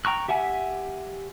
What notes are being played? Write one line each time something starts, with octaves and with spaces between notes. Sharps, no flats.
G5 A#5 C#6 F#6
G4 E5 F#5 G#5